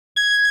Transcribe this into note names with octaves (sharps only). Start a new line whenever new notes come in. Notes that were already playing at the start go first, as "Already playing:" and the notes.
G#6